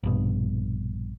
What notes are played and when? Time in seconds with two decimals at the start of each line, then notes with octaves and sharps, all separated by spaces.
0.03 A#1 G2 B2